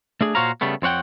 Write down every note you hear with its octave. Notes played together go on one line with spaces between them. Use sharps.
A3 D4 G#4
A#2 F#4 C5 C#5 F5 A#5
C#3 G3 A3 B3
F2 C4 C#5 F#5 G5